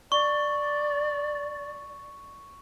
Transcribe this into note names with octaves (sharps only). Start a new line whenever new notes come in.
D5 C#6